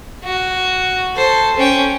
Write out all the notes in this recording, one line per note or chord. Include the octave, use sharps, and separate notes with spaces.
F#4
A4 C5
C#4 G5